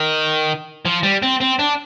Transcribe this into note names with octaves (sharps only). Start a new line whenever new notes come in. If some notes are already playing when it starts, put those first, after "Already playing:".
Already playing: D#3
F3
G3
C4
C4
D4